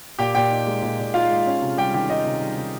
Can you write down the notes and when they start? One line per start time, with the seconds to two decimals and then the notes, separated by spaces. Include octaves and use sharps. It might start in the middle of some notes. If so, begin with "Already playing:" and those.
0.19 A#2 G4 G5
0.35 A#2 G4 G5
0.51 D#4
0.67 G#3
0.83 A#2
0.99 A#2
1.14 D#4 F4 F5
1.30 G#3
1.46 C#4
1.61 C3
1.77 G3 G4 G5
1.94 D#3 G4 G5
2.09 C#4 D#4 D#5
2.25 C3
2.42 G3
2.57 D#3